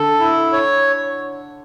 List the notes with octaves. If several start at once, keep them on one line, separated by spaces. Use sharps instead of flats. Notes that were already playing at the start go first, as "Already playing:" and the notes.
Already playing: D3 A4
E4
C#5